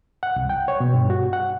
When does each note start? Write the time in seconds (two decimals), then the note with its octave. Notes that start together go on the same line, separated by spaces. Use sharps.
0.23 F#5
0.36 C2
0.49 G5
0.68 C#5
0.80 B2
0.94 G2
1.10 F#4
1.33 F#5